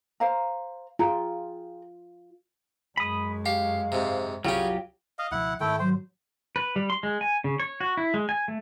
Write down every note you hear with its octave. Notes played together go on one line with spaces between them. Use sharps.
C5 F5 A#5
F4 G#4 G5 A#5
F#2 G#3 B5 D#6
G4 F5
G#2 C3
C2 C#3 F#3 C#4 F4 G4
D#5 F5
C#2 B2 F3 E4 F#5
G#2 D#3 A3 E4 G5
F#3 C5
B4
G3
C6
G#3
G#5
C#3
C#5
F#4
E4
G#3
G#5
A3